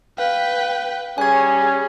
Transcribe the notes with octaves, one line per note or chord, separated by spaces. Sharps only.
B4 F5 G5
G3 C#4 G#4 G#5 G#6